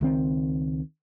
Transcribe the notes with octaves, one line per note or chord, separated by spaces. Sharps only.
C#2 D#3 C4